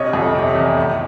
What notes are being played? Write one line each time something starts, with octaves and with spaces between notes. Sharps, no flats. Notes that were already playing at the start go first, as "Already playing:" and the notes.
Already playing: A#1 C3 C#5 D#5
F2
C3
E2
A2